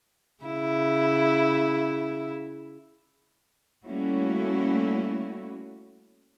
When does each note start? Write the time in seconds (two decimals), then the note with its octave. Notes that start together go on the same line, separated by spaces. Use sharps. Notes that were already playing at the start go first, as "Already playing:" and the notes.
0.43 C#3 E4
3.85 G3 A3 A#3 C#4 E4 F#4